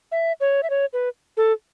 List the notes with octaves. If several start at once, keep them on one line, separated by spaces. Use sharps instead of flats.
E5
C#5
E5
C#5
B4
A4